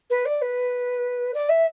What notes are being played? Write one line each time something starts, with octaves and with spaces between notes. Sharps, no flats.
B4
D5
B4
D5
E5